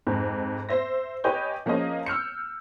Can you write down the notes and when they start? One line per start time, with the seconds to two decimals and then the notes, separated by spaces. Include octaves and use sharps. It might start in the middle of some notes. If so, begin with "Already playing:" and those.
0.07 F2 G#2
0.69 C5 E5 A#6
1.24 G4 B4 C#5 D#5 G#5 G6
1.66 F3 A#3 C#4 G#4 D#5
2.06 E6 F6 G6 C#7